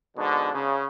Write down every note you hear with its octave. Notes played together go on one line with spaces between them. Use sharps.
G#2 B2 D3
C#3